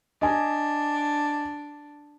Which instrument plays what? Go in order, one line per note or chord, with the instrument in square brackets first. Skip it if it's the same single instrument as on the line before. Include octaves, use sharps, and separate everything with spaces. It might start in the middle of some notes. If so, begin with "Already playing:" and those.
[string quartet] D4 [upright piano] D#5 G#5